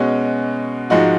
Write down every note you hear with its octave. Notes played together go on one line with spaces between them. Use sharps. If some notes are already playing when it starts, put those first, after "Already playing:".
Already playing: B2 G#3 C#4 F#4
G#2 F3 G#3 D#4 F#4